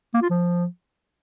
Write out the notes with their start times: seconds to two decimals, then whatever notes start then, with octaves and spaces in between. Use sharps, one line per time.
0.14 A#3
0.22 F4
0.30 F3